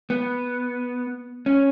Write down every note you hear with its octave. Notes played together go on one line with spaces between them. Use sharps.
B3
C#4